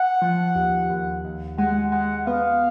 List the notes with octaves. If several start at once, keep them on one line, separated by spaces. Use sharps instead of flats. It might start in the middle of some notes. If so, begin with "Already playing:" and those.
Already playing: F#5
F3
D#2
D#2
D#2
G#3 F#5
G#3 F#5
B3 F5